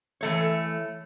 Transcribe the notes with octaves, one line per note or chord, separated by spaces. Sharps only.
E3 A3 C#5